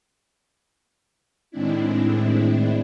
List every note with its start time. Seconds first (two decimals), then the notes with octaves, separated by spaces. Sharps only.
1.51 A2 D#3 G#3 C4 D4 E4